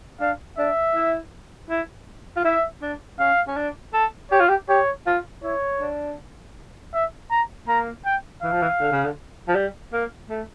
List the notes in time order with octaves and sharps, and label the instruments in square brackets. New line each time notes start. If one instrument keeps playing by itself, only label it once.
[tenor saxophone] D4 [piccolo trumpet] F5
[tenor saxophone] D4 [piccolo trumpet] E5
[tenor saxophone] E4
E4
F4
[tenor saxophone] E4 [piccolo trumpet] E5
[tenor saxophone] D4
[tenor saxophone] C#4 [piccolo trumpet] F5
[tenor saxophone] C#4
D4
A4
[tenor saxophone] G4 [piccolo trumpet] C#5
[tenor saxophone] F4
G4
[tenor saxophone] G4 [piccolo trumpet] C#5
[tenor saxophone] F4
[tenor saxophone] E4 [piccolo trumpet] C#5
[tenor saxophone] D4
[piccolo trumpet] E5
A#5
[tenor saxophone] A#3 [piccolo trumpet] A#5
[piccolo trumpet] G5
[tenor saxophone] E3 [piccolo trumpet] F5
[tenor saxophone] F3
E3
D3
C#3
D3
F3
G3
A#3
A3